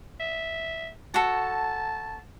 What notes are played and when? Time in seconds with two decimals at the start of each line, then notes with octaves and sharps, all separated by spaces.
0.20 E5
1.14 F#4 A4 A5